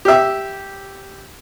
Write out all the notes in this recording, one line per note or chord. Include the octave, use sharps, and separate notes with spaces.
G4 E5